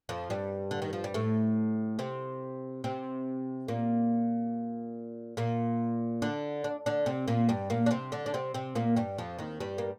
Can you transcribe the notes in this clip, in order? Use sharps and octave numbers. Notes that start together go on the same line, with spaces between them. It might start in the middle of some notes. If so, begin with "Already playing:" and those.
F2 F3
G2 G3
D3
D#3
F3
G3
A2 A3
C3 C4
C3 C4
A#2 A#3
A#2 A#3
D3 D4
D4
D3 D4
C3 C4
A#2 A#3
G2 G3
A#2 A#3
D4
C3 C4
D3 D4
D4
C3 C4
C3 C4
A#2 A#3
G2 G3
F2 F3
D#2 D#3
G2 G3
A#3